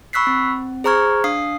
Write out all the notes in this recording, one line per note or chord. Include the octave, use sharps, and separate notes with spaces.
B5 C#6 E6 F#6 B6 C7
C4
G#4 C5 A#5 C#6 F6 G#6
D4 F5 D#6 C7